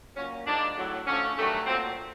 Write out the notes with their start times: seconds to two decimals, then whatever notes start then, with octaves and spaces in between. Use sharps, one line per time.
0.17 A#2 F#3 A#3 C#4
0.46 G#2 F3 G#3 D4
0.76 A2 F#3 A3
1.07 D3 F3 A3 C#4
1.37 G2 D#3 F#3 A3
1.67 A#2 F#3 A3 C4